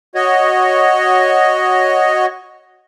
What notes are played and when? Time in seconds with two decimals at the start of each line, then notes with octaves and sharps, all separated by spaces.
0.15 F#4 C#5 D#5